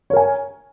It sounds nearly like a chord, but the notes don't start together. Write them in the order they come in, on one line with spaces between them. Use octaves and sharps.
C#5 A#4 G#5